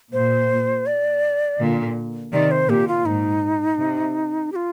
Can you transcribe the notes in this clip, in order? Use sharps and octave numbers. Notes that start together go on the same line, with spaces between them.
A#2 C5
D5
A#2 D3
C3 D#3 D5
C5
A#2 G4
F4
G#2 D#4
C3
G4
F4